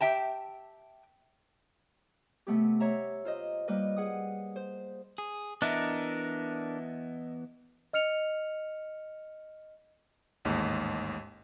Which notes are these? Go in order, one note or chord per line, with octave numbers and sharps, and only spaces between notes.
G4 E5 G5 A5
C3 A3 B3 G4
C#5 E5 A#5
F4 C5 D#5
G3 A#3 B4 D#5
G#4 F#5 D#6
C5
G#4
E3 B3 D4 A#4 D#5 E5
D#5 F6 C#7 F7
A1 D#2 G#2